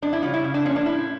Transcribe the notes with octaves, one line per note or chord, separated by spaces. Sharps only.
F2 D4
E4
C#3 G3 C#4 F4
E4
C#3
D4
F3 A#3 C#4
D4
A2 E4